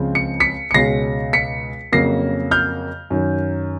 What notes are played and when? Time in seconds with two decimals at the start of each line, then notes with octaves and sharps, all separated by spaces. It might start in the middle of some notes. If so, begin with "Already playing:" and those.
Already playing: C#2 C#3 F3 G#3 C4
0.15 C#7
0.40 B6 C#7
0.71 C#7
0.74 C#2 B2 G#3 C#4 A#6 C7
1.33 B6 C#7
1.92 F2 C#3 F#3 A#3 A#6 C7
2.51 F6 G6
3.10 F#2 D#3 F#3